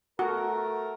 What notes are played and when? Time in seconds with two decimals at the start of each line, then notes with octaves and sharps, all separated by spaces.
0.19 A3 F#4 A#4